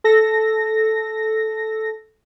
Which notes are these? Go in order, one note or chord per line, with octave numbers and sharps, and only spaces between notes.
A4 A#6